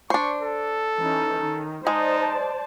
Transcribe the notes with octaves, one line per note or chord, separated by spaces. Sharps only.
D4 C5 C#6
A4
E3 C#4 D#4
D#3
G#3 D#4 C5 D5 A5